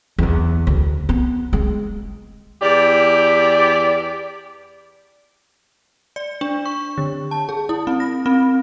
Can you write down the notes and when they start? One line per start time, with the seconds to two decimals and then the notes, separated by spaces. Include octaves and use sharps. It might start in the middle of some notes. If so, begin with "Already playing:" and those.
0.19 E2 E3
0.67 D2
1.09 B3
1.53 G#3
2.61 E2 G4 D5
6.16 D5
6.41 D4
6.66 C#6
6.98 D3
7.31 A5
7.49 G#4
7.69 E4
7.87 C4
8.00 A#6
8.26 C4